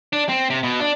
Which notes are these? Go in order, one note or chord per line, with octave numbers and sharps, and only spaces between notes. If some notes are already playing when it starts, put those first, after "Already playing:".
D4
C4
C3
B2
D4